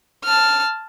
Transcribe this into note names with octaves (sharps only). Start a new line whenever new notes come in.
A5 F6